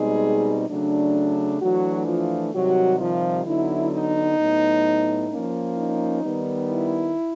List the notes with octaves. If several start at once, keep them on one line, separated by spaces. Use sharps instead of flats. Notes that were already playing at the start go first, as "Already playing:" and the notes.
Already playing: B2 G3 G#3 C4 D#4 G#4
C#3 F#3 A3 D4
E3 F#3 A3 D4 F#4
F3 F4
C3 D#3 F#3 G3 F#4
F3 F4
D3 F#3 B3 D#4 E4
D#4
A2 F#3 B3
F3 A#3 C#4
D#4
D#3 G3 B3
E4